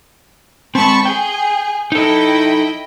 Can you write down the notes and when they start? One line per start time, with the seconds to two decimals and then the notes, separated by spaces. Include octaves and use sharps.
0.75 G#3 C4 A5 B5 C#6
1.05 G#4 G5
1.92 D#4 E4 A4 D#5 G5